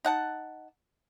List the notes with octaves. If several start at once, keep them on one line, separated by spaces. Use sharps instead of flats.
D#4 F#5 A5